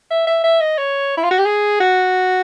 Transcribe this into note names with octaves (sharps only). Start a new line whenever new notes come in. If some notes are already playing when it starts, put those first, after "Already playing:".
E5
E5
E5
D#5
C#5
E4
F4
F#4
G4
G#4
F#4